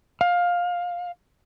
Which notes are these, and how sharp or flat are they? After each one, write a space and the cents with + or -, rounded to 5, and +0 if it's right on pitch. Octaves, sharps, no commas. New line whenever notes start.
F5 +15